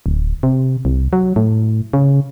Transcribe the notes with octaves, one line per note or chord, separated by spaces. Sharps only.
D1
C3
C2
F#3
A2
C#3